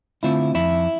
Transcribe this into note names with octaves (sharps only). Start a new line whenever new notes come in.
D3 A3 C4 E4 F4 E5
F2 E4 E5